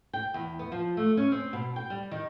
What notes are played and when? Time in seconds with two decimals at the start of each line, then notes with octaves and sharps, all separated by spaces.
0.13 G5
0.34 E2
0.59 B3
0.72 F3
0.97 A3
1.17 C#4
1.32 C4
1.53 B2
1.76 G5
1.90 G3
2.11 D#3